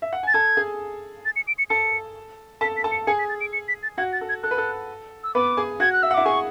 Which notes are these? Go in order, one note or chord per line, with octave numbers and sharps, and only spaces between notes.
E5
F#5
G#5 A6
A4 A5 G#6
G#4 G#5
A6
C#7
D7
C#7
A4 A5 C#7
A4 A5 B6
B6
A4 A5
C#7
G#4 G#5 C#7
B6
A6
D7
C#7
B6
A6
F#4 F#5 G#6
A6
A4
G#6
A4 F#6
B4
A4
E6
B3 B4 D6
G#4 G#5
F#4 F#5 G#6
F#6
E5 E6
F#5
E4 E5 D6
G#4 G#5 C#6